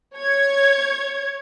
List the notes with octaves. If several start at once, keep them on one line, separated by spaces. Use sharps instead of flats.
C#5 G#6